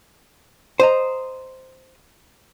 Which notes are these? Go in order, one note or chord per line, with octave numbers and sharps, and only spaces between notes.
C5 D#5 A#5